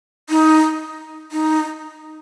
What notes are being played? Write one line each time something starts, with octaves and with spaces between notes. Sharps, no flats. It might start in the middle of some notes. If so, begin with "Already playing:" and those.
D#4
D#4